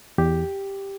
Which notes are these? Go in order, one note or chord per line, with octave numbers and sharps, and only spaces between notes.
E2 G4